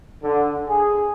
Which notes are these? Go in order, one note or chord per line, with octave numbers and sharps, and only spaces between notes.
D3
G#4